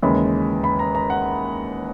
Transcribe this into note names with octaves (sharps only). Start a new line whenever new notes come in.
D#2 C#3 E3 G#3 B5
B5
A#5
A#5
F#5